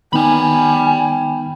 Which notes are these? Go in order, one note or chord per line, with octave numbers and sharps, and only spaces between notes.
D#3 B3 D#4 G5 G#5 B5